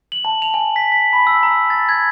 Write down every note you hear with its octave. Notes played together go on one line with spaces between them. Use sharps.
F#7
A5
F7
G#5
B6
B6
B5
E6
A#5
A6
G#6